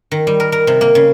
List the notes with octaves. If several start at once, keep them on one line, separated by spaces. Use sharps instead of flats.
D#3
G3
A#4
A#4
C3
A#3
C#3